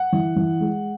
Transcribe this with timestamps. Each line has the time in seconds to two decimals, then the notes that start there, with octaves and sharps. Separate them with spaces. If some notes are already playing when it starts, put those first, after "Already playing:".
Already playing: F#5
0.13 E3
0.36 E3
0.61 G#3